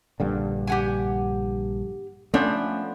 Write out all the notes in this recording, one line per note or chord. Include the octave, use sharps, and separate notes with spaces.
A#1 G2 D3
G4 F#5 G#5
F3 A3 B3 C#4 D4